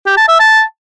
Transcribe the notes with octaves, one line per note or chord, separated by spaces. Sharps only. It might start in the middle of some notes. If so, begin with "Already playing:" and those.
G4
A5
E5
A5